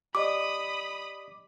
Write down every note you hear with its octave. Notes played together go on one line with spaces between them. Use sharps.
G4 D5 D#5 B5 D6 D#6